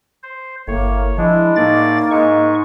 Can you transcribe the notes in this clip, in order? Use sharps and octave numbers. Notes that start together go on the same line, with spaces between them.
C5
G1 A2 A#3 C#5
F3 G#3 D4 E4
A2 A#3 D#4 D5 A6
G#2 G#3 C#6